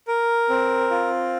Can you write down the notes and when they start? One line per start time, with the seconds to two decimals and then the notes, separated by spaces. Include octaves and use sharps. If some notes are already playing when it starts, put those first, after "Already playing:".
0.08 A#4
0.50 C4
0.90 F4